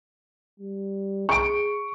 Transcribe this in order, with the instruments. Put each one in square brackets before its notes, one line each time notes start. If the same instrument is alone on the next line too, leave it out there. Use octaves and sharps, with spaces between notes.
[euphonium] G3
[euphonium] G#4 [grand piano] C#6 D7